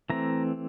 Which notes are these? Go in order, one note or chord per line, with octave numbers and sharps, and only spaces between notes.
E3 A3 C4 A#5